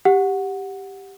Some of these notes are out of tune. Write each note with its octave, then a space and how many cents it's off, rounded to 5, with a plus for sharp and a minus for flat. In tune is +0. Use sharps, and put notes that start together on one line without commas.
G4 +0 F#5 -10